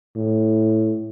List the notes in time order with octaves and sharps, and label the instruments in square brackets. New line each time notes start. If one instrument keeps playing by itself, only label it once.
[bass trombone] A2